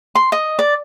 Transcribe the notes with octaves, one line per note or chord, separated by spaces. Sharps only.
C6
D#5
D5